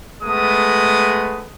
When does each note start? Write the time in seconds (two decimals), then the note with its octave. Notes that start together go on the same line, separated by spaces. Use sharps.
0.23 G#3 A3 B3 D#6